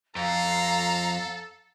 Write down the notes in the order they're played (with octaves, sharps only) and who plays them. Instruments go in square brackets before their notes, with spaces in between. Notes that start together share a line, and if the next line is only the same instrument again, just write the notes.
[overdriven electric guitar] F2 [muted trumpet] A4 [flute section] F5 [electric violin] A#5